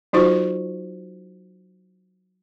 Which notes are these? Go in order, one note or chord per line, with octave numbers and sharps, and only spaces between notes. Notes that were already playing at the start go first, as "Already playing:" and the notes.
F#3 D#4 F4 F#4 C5 C#6